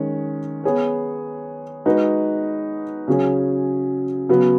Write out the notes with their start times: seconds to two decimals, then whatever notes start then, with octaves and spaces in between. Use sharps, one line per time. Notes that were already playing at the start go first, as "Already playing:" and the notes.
Already playing: D#3 G#3 C#4
0.64 B3 G#4 C#5
1.85 G#3 D#4 F#4 B4
3.08 C#3 F#3 C#4 G#4
4.29 C#3 F#3 B3 F#4